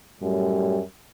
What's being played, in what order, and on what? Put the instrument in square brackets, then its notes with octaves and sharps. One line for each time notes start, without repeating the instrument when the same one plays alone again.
[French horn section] F#2 A2 G3